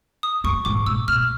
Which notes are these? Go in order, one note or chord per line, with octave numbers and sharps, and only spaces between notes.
D#6
F#2 C#6
G#2 D6
A#2 E6
B2 F6